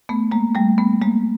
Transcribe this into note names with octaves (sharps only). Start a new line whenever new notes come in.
A3 B3
G#3 A#3
G3 A3
A3 B3
G#3 A#3